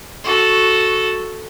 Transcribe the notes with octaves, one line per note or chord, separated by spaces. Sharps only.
F#4 A4